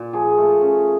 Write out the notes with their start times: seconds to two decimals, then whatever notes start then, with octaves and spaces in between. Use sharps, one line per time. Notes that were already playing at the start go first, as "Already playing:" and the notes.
Already playing: A#2
0.13 F3 G#4
0.38 A3
0.62 C#4